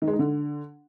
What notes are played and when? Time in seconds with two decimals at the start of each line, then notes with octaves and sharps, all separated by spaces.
0.02 D#3
0.08 G#3
0.13 D#4
0.19 D3